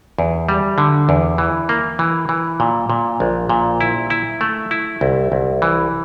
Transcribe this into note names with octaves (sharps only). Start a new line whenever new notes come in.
E2
G3
D3
E2
E3
A#3
E3
E3
A#2
A#2
A#1
A#2
E4
E4
A3
E4
C2
C2
E3